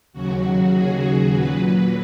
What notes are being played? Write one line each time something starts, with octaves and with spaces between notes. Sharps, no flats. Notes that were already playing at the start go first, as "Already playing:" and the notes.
D#2 C#3 F#3 F#4
G#4
A#2 F#3 B4
B4